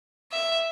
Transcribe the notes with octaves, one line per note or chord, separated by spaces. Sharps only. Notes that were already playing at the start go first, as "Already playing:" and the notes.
E5